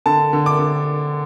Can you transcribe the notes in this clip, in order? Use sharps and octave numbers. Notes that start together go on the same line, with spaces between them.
D3 A5
D3
D6
D3